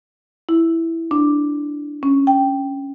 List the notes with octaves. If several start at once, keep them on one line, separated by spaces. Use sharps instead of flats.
E4
D4
C#4
G5